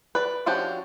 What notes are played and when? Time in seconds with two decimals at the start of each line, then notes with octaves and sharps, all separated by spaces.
0.15 B4 D5
0.46 F3 C#4 D4 F#4 G4